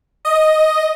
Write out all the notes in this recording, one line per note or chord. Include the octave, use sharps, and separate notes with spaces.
D#5